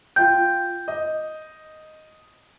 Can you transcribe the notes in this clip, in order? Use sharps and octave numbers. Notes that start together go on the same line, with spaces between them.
F4 G5 G6
D#5